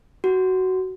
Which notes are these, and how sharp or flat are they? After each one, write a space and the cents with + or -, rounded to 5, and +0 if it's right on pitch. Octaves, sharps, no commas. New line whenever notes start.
F#4 +15